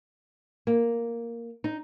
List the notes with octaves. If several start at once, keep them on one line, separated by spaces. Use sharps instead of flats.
A#3
D#4